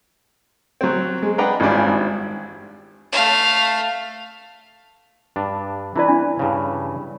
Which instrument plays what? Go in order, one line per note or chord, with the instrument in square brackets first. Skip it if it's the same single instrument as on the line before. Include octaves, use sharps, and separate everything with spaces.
[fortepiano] F#3 C4
G#3
D4 B4 D#5 F#5 G5 A#5
G#1 E3 G3 C#4 D4 F4
G#1
[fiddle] A3 F5
[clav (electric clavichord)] G2 D4
[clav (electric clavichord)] E3 B4 [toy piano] D4 E4 D5
[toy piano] D4
[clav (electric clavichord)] G2 C#3